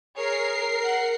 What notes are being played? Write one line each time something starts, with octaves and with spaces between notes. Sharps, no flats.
G#4 A#4 C#5 C7
F#5